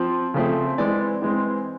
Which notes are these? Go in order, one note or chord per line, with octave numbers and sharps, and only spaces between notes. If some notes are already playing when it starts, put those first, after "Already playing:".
Already playing: F3 C4
C#3 F3 A3 C4
E3 G#3 C4 D5
E3 G#3 C4